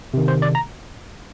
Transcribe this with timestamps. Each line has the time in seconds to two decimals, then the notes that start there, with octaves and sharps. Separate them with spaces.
0.14 C3 D#3
0.28 C5
0.42 D5
0.55 A#5